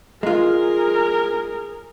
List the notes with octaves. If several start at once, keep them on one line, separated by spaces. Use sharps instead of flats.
G#3 F4 G#4 A#4